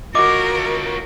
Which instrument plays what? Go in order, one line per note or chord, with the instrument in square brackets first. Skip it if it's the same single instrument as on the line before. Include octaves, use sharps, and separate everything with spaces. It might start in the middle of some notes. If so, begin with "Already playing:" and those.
[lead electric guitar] F4 C#5 [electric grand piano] F#4 D#5 [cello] A#4 [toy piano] D6